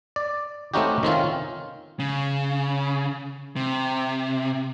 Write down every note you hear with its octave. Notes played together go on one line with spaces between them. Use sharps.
D5
A3 C4 C#4 D#4 F#4 G4
D#3 C4 C#4 F4
C#3
C3